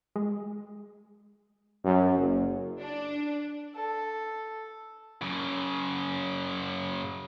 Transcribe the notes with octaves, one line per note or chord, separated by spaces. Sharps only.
G#3
F#2
F#1
D4
A4
F#2 C#3